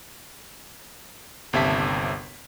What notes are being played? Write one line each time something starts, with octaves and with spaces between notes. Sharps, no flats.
G1 D#2 C3 E5 A5 B6